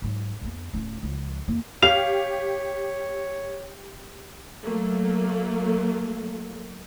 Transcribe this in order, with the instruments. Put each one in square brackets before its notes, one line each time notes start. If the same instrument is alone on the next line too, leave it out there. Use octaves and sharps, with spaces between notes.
[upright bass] G#2 F#3
F2 B3
D1 C#4
C#2 F3
F2 A#3
[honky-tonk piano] G4 [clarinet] C#5 [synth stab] F5 [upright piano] F7
[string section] F#3 A3 A#3